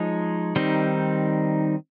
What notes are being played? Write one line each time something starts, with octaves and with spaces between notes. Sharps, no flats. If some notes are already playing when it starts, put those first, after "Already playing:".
Already playing: F3 G#3 D#4 G#4 C#5
D#3 G3 C4 D#4